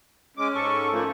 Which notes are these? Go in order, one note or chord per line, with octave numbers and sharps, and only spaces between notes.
G#3 C#4 D6
G#2 A4 C#6
F3 A3 A#3